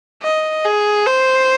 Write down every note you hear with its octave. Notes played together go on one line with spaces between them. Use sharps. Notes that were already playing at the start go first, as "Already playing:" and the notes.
D#5
G#4
C5